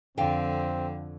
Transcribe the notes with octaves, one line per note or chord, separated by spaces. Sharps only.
F2 D3 C4 F5 G5